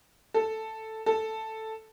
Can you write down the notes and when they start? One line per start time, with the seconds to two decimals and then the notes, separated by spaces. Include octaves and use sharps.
0.34 A4
1.06 A4